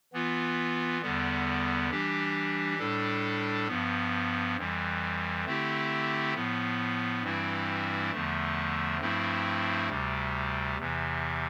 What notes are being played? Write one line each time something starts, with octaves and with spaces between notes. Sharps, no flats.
E3 B3 F4
E2 D3 G3 B3
E3 G3 D4 G4
A2 G3 D4 A4
G2 F3 B3
F2 E3 G3
D3 A3 C4 E4 G4
A2 F3 B3
G2 E3 G3 C4 E4
E2 D3 F3 A3
G2 F3 A3 C4 E4
D2 C3 G3
E2 C3 E3